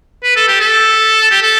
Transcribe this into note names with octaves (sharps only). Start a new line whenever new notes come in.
B4
A4
G4
A4
G4
A4